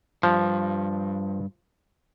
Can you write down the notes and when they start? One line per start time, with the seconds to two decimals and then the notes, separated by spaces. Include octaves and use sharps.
0.23 G2 F3